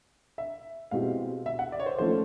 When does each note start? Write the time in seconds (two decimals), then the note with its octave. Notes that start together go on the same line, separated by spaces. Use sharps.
0.38 E5
0.91 B2 G#3 C4 E4 G4 F5
1.46 E5
1.59 F#5
1.72 D5
1.80 C#5
1.86 C5
1.98 F3 A3 C#4 F4 C5